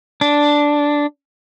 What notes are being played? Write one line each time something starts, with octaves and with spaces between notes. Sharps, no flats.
D4